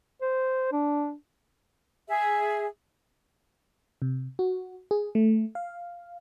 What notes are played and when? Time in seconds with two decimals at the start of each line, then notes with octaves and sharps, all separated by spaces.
0.22 C5
0.72 D4
2.08 G#4 E5
4.02 C3
4.39 F#4
4.91 G#4
5.15 A3
5.55 F5